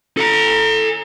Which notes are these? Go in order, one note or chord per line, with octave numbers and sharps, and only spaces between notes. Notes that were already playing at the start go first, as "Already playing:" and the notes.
A4 A#5